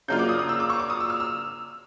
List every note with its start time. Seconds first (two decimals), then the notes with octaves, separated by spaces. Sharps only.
0.08 C#3 F#3 A#3 D4 F4 G6
0.19 D6
0.29 D#6
0.39 D#6
0.49 E6
0.60 D6
0.70 C#6
0.80 D6
0.90 D#6
1.00 E6
1.10 F6
1.20 E6